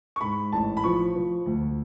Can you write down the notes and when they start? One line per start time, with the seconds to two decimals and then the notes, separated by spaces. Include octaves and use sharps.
0.16 C#6
0.21 G#2 B5
0.52 A1 A5
0.77 B5
0.84 F3 C#6
1.16 F3
1.46 D2